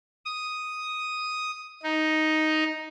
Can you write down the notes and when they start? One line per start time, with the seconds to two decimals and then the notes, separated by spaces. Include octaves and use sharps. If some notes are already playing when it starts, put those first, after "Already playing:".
0.25 D#6
1.83 D#4